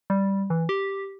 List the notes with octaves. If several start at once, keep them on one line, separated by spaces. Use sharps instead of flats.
G3
E3
G4